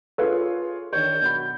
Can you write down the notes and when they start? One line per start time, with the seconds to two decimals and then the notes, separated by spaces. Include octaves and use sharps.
0.18 F4 G#4 A4 B4 C#5 F5
0.93 D#3 D4 C#5 G6
1.21 B1 F#4 B5